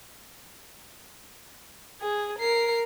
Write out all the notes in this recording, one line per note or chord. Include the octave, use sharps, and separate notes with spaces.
G#4
A#4 C7